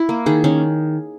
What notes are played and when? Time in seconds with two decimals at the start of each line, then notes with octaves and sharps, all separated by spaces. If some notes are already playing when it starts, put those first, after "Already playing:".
Already playing: E4
0.09 A#3
0.26 D#3 G#4
0.44 D#3 C#4